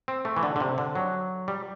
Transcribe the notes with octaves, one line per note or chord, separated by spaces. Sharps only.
C4
A3
E3
D3
D3
C3
D3
F#3
G3